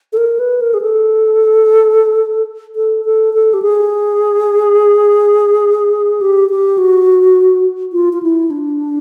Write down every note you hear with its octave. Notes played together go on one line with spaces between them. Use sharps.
A4
A#4
B4
A#4
G#4
A4
A4
A4
A4
G4
G#4
G4
G4
F#4
F4
F4
E4
D4